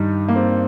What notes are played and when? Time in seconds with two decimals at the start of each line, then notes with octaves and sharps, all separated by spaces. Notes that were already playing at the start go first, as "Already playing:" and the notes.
Already playing: G2 D#3 G3 D#4
0.28 A#3
0.36 C4